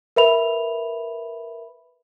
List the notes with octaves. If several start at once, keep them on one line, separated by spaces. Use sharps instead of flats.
A#4 B4 E5 B5 F7